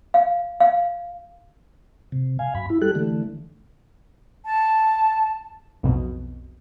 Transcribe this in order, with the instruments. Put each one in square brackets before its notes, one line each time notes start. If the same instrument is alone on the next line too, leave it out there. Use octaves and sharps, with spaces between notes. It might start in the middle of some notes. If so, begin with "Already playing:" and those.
[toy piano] F5
F5
[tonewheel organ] C3
F5 G#5
F#2 B5
E4
G3 G4 A4 F#6
D3 E3 A3
[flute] A5
[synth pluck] B1 F2 B2